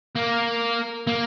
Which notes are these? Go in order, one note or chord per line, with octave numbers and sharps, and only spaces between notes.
A#3
A#3